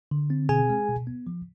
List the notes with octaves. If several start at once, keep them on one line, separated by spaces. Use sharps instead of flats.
D3
C4
B2 G#4 G#5
G#3
B2
B3
F3